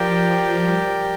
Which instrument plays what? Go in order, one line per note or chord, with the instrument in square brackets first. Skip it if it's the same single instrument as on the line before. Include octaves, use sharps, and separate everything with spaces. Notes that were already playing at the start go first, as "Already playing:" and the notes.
Already playing: [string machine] F3 [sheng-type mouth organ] G4 A#4 D5 G5
[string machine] G3